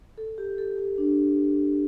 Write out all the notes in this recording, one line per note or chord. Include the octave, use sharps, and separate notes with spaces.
A4
G4
A4
G4
D4